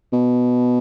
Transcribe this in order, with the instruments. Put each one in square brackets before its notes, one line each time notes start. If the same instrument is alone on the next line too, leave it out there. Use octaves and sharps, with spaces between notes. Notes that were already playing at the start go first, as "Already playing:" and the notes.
[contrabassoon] B2